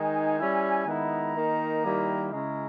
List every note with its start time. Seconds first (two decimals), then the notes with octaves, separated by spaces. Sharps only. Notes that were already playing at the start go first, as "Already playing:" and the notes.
Already playing: D#3 G#3 D#4 G#5
0.38 G3 C#4 E4
0.86 D#3 G#3 B3 E4 A#5
1.35 D#3 A#3 D#4
1.83 D#3 G3 A#3 E4
2.32 C#3 G#3 C#4 E4 A#5